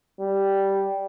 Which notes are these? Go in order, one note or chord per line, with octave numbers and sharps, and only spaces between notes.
G3